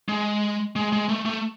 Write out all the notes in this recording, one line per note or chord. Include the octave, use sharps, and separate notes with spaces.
G#3
G#3
G#3
A3
A3